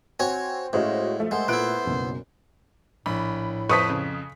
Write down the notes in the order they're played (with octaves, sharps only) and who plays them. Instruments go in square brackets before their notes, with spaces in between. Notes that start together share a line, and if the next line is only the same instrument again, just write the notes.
[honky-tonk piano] C4 [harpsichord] F#4 C#5 G#5
[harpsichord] A2 [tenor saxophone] G#3 [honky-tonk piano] C#4 F#4 C5 [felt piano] D#5 F5
[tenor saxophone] F3 [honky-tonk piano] A3
[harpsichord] G#3 [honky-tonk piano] A3 [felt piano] A#4 F#5 [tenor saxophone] C5
[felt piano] A#2 F#6 D7 [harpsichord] B3 E4
[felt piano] F#1 B1 F#2
[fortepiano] A#1 [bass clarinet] A2 [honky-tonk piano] B5
[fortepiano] F2 [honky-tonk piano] B4 C5 A5 [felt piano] C#6 D#6 B6
[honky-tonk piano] C#3